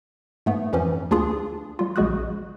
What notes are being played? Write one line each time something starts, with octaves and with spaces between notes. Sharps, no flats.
G#2 A3 B3
F2 E3 F3 C#4
D2 D4 F4 G#4
G3 F4
A#1 C#3 G#3 F#4 D#6 F#6